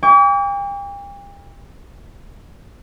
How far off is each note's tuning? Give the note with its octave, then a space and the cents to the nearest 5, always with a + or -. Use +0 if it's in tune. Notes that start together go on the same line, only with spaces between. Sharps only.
G5 +40 D6 -45